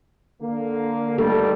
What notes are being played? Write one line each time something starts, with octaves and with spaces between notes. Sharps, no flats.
D3 A#3
G1 D#2 G3 A3 A4